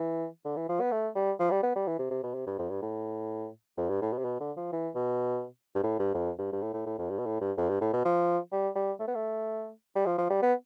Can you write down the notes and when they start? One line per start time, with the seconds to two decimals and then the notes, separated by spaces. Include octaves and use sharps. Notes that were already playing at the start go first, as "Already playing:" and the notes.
Already playing: E3
0.45 D3
0.57 E3
0.69 F3
0.81 B3
0.92 A3
1.15 G3
1.40 F3
1.51 G3
1.63 B3
1.76 G3
1.87 E3
1.99 C3
2.11 C3
2.24 B2
2.35 C3
2.47 G2
2.59 F2
2.70 G2
2.82 A2
3.78 F2
3.89 G2
4.02 A2
4.13 B2
4.18 C3
4.25 B2
4.41 D3
4.57 F3
4.73 E3
4.96 B2
5.75 G2
5.84 A2
5.99 G2
6.14 F2
6.39 G2
6.52 G2
6.62 A2
6.74 A2
6.86 A2
6.99 F2
7.10 G2
7.19 B2
7.26 A2
7.41 G2
7.58 F2
7.69 G2
7.81 A2
7.93 B2
8.05 F3
8.52 G3
8.76 G3
9.00 A3
9.08 B3
9.15 A3
9.96 G3
10.06 F3
10.18 F3
10.30 G3
10.43 B3